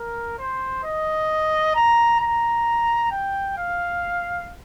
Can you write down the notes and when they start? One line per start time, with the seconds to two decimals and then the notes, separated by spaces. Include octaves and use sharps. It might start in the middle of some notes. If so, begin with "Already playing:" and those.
Already playing: A#4
0.39 C5
0.84 D#5
1.75 A#5
2.20 A#5
3.11 G5
3.58 F5